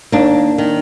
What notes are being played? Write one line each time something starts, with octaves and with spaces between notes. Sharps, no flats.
D#2 A#3 D4
D#3